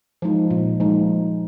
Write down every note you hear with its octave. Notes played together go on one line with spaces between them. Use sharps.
F3 G#3 D#4
A#2
F3 G#3 D#4